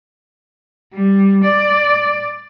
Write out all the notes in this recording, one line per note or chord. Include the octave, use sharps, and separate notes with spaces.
G3
D5